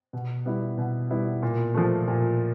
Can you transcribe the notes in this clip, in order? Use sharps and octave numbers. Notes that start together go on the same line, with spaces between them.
B2
G3 B3 E4
B2
G3 B3 E4
A#2
F3 A3
A#2